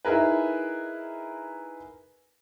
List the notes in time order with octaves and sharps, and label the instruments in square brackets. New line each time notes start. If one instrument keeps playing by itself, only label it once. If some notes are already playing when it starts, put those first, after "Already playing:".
[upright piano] D#4 E4 G#4 A#4 B4